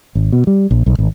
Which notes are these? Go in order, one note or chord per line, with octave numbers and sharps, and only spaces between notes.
G#1
B2
G3
A#1
B1
G#1